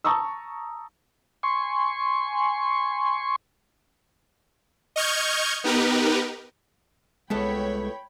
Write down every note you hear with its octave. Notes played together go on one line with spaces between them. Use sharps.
A5 A#5 C#6 D#6 E6
G#5 C6 C#6
D#5 C#6 F6 G6 G#6
B3 D#4 G4 A#4 B4
C2 G#3 A3 B3 A4 C#5 G5 B5